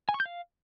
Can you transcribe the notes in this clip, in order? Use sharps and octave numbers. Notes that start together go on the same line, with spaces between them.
G#5
C#6
G6
F5